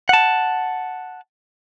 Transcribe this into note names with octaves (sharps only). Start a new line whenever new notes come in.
F#5 A5